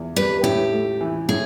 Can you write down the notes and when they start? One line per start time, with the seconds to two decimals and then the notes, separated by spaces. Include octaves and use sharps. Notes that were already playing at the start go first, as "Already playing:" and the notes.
Already playing: E2
0.16 G3 B4
0.43 A2 G4
0.73 A3
1.01 E3
1.29 A2 G#4